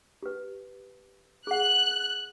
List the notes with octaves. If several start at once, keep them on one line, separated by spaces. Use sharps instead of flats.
G4 B4
G#4 F#5 F#6